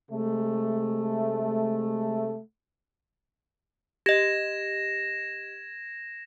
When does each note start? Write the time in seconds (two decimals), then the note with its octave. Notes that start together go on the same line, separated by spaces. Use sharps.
0.10 C3 G#3 A3
4.06 G4 D#5 G#6 A#6 E7